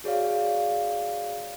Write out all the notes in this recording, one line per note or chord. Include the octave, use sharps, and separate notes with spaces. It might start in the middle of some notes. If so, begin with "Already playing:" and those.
F#4 G#4 C#5 D5 F5